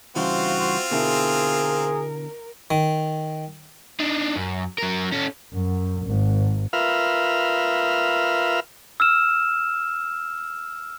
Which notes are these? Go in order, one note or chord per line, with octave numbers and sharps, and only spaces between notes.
G2 C#3 E3 C4 F4 F#4 C5 F5
B2 D3 E4 G#4 A#4
D#3
D4 D#4
F#2
F#3 A#4
C#4 A4
F#2
G#1
F4 A#4 B4 E5 F5
E6 F6 E7